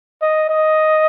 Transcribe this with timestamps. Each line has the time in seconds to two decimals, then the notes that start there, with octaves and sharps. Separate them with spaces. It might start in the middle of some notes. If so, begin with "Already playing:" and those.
0.22 D#5
0.50 D#5